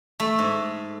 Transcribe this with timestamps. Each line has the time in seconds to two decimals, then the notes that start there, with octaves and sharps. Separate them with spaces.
0.20 A3
0.39 G#2